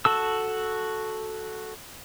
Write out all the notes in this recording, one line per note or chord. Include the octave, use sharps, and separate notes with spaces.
F#4 A4 E6